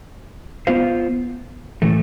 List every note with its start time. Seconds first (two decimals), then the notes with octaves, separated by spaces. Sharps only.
0.67 B3 F4 C5 F5
1.82 A2 E3 A3